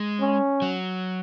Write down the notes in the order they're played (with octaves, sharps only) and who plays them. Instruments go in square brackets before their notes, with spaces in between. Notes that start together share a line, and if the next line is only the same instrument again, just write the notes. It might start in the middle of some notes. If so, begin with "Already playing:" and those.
Already playing: [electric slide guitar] G#3
[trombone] C#4
[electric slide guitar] F#3